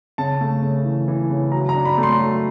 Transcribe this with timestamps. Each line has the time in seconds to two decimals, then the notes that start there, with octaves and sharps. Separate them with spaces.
0.18 C#3 A5
0.41 A3
0.62 C#3
0.85 E3
1.08 E3
1.30 C#3
1.52 F#3 A#5
1.69 A#5
1.75 D4
1.85 B5
1.98 A3
2.03 C6
2.19 F#3